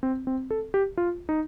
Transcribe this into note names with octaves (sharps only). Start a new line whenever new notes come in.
C4
C4
A4
G4
F4
D#4